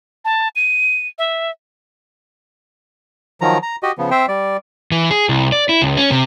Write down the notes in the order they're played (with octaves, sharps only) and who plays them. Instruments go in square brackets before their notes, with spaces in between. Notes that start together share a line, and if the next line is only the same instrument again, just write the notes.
[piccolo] A5
D#7
E5
[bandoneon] D#3 F3 F#3 A#5
A#5
F#4 G4 D#5
C#3 F3 B3
C4 C5 E5 G5
G3 D5
[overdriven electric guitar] E3
G#4
C2
D5
E4
C#2
C#4
C3